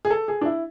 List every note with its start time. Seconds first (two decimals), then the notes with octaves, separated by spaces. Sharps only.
0.05 G#4
0.10 A4
0.28 G#4
0.41 D4
0.46 E4